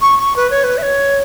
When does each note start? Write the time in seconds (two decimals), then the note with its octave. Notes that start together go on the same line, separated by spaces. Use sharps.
0.01 C#6
0.19 C#6
0.36 B4
0.51 C#5
0.64 B4
0.78 E5
0.83 C#5